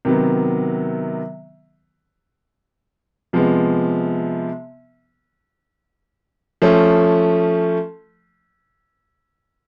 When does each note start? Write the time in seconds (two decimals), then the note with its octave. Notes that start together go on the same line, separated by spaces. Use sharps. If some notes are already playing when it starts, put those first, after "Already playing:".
0.05 C3 D#3 F#3 B3
3.33 C3 F3 G#3 B3
6.62 F3 A3 C#4